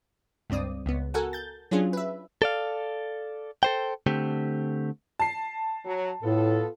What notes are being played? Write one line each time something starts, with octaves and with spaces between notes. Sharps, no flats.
C#2 G2 C4 D5 D#6
C#2 B3
F#4 A4 A#4 F#5 G#5
G6 A6
F#3 C#4 D4 F4 G#4
B4 E5
A4 D5 F5
A4 C5 G5
D3 A3 C4 G4
A5 C7
F#3
A2 B3 F4 A4